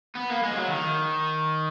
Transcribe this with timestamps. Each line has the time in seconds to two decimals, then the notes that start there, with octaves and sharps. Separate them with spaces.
0.15 B3
0.30 A#3
0.43 G#3
0.51 F3
0.57 F#3
0.70 D#3